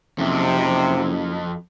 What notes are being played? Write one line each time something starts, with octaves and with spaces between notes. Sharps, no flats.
F#1 F2 C3